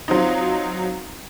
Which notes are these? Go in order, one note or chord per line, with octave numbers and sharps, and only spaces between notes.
F3 F#3 C4 D#4